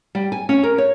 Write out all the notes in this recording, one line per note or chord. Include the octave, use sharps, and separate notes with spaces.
G3
G#5
C#4
A#4
C#5